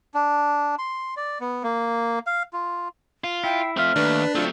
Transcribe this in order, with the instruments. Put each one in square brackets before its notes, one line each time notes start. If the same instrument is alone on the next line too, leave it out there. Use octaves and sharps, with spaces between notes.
[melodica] D4
C6
D5
B3
A#3
F5
F4
[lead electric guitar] F4
[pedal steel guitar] E4 [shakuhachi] G5
[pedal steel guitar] A3 F6 [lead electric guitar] C4 F4 [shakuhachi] E5
[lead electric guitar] D#2 [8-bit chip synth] D4 [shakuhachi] B4
[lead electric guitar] F#3 A3 [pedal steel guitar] C4 [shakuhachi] F4